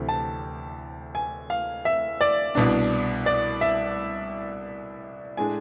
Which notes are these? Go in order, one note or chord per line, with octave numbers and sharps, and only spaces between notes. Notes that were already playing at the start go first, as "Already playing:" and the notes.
Already playing: D2 C3 E3
A5
G#5
F5
E5
D5
C2 B2 B3 D4
D5
E5
A2 G#3 D4 G#5